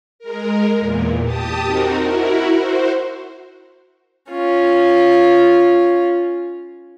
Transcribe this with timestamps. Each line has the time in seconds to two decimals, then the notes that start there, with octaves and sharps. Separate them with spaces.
0.19 G#3 A#4
0.77 E2 A#2
1.23 G4 A5 D#6
1.65 C4 D#4 F#4 A#4
2.03 E4 F#4 A#4
2.54 F#4 C5
4.31 C#4 F4